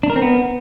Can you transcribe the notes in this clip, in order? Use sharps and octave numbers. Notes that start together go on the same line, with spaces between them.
D4
A#4
C4
B3